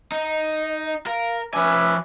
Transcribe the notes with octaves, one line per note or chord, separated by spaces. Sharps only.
D#4 D#5
A#4 F5
F3 C#4 B4 E5 G#5 D6